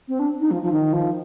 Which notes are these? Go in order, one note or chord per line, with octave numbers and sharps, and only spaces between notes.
C4
D4
D#4
F3
F3
D#3
F3